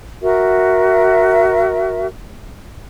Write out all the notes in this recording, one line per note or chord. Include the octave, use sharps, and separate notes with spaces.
F#4 A#4 E5